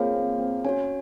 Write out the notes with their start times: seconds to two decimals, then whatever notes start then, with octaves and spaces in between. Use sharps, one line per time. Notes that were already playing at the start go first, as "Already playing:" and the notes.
Already playing: A#3 C4 F4 G#4 C#5 F5
0.13 C4
0.38 C4
0.64 C#4 F#4 C#5 G#5